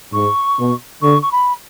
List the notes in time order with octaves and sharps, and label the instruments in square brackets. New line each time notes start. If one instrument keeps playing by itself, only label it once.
[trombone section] G#2 [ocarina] C#6
[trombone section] B2
[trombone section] D3 [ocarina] C#6
[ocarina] C#6
B5